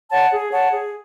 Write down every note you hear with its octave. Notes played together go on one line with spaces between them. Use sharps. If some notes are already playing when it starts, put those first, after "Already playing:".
C#5 F#5 A5
G#4
C#5 F#5 A5
G#4